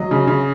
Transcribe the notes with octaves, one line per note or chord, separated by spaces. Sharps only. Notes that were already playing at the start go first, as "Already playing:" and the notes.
Already playing: F#3 D#5
C#3
C#3